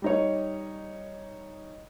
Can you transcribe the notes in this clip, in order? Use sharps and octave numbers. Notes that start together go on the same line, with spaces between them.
G3 D#4 C#5